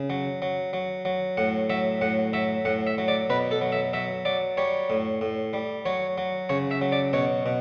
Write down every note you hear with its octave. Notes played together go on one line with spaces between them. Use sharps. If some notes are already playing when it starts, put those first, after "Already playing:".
Already playing: C#3
F#3
F#3
F#3
F#3
A2 F#5
F#3 E5
A2 F#5
F#3 E5
A2 F#5
E5
F#3
D5
B2 B4
A4
F#3
E5
F#3 E5
F#3 D5
G3 C#5
A2
A2
G3
F#3 C#5
F#3
C#3 C#5
E5
F#3
D5
B2 C#5
B2